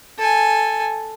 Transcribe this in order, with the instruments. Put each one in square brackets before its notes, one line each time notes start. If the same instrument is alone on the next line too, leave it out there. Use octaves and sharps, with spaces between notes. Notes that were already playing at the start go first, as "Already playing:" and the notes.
[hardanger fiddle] A4 G#5